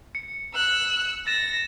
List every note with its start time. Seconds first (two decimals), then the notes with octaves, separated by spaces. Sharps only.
0.15 C#7
0.54 E6 F#6
1.27 A6 A#6 E7